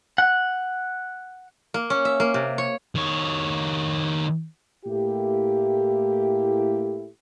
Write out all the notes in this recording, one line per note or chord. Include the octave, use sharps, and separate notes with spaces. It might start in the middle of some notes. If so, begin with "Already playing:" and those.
F#5
A#3
C#4
E5
A#3
C3
C#5
D#3 C#5
A2 A3 A#3 E4 G4